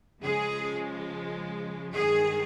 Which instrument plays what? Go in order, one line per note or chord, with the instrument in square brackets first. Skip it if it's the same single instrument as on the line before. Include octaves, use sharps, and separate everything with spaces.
[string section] C#3 F3 G#3 [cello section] G#4
[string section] G2 D#3 G#3 [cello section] G#4